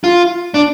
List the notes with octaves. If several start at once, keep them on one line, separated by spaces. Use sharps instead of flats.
F4
D4